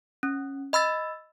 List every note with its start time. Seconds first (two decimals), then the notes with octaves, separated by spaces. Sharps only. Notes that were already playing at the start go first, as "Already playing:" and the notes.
0.23 C#4
0.73 D#5 B5 E6 A6